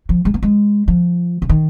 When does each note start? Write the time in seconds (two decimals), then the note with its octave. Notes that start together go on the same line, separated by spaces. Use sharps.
0.09 F3
0.25 G#3
0.34 A#3
0.43 G#3
0.88 F3
1.42 C#3
1.49 D#3